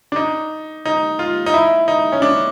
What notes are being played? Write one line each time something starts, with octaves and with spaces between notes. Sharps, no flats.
D4
D#4
D#4
F4
D#4
E4
D#4
C#4
D4